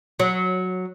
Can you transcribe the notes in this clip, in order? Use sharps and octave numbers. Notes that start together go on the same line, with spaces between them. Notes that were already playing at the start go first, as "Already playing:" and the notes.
F#3